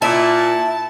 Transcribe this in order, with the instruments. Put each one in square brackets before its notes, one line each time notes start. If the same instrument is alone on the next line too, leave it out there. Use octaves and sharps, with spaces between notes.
[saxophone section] A#2 [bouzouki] E4 [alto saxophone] A5